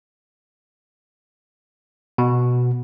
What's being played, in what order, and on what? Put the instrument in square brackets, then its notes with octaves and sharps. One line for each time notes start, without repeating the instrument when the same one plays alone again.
[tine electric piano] B2